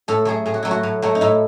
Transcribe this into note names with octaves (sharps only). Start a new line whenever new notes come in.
A2 A4
F#3 A3 G#4
A2 G#4
F#4
F#3 A3 E4
F#4
A2
F#3 A3
D#4
A2 E4